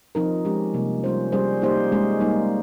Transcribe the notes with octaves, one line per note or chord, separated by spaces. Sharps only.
F3 C4 D#4 A#4
F3 G#3 C#4 G4
C3 G3 A#3
G3 C#4 F4 C5
G3 C#4 G#4 C5
A#3 D#4 G4 C5
G#3 C#4 G#4
G3 A#3 D#4